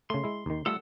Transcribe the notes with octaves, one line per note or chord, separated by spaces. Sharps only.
C#3 A3 C6
G#3 E4
D#2 D#3
G3 A3 F4 A4 F#5 E6